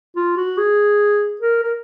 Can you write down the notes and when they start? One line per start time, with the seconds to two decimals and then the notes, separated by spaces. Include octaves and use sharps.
0.16 F4
0.37 F#4
0.58 G#4
1.41 A#4
1.64 A#4